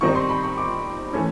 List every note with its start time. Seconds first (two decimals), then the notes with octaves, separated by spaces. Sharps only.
0.01 D#3 G3 C4 D#4 C#6
0.15 C6
0.29 B5
0.43 C#6
0.57 D6
1.13 E3 A3 C#4